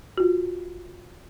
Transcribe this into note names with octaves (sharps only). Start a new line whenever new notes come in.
F4 F#4